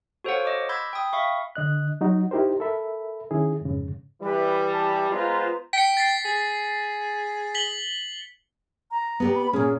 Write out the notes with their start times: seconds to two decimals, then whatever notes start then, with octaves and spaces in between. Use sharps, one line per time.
0.24 F#4 A4 C5 C#5 F5 F#5
0.45 D#5 D6
0.69 B5 C6 E6 G6 G#6 B6
0.93 G5 D#6
1.13 E5 F5 B5 C#6
1.55 D3 D#5 F#6
2.01 F#3 D#4 F#4
2.31 D#4 E4 G4 A#4 C5
2.60 A4 A#4 E5 B5
3.31 D#3 C#4 E4 G#4
3.61 F2 G#2 C#3
4.21 E3 G3 B4
4.72 A5
5.11 G#3 B3 F4 B4 C5 A#5
5.73 G5 B6 C#7
5.97 A6 B6 C7
6.25 G#4
7.55 B6 F#7 G7
8.91 A#5
9.20 B3 G4 D5
9.35 B5
9.53 A#2 C#4 G#4